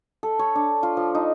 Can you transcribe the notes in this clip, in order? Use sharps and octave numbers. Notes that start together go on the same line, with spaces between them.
A4
C#5
D4
F4
F3
D#4